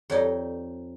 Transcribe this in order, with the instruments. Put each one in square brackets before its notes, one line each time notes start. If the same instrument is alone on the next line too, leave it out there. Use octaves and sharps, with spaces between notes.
[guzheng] F2 D#4 [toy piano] G4 C#5 D5